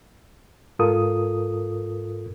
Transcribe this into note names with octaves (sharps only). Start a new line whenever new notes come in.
G#2 F4 A4 A#4 D#6